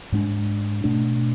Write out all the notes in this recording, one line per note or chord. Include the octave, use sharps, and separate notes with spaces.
G#2 G#3 D4
B2 A3 D4